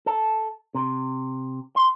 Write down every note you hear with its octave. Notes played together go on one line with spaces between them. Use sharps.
A4
C3
C6